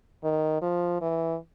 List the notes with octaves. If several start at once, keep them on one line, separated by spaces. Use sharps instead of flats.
D#3
F3
E3